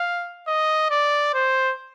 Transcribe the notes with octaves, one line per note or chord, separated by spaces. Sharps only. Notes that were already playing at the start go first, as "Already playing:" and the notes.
Already playing: F5
D#5
D5
C5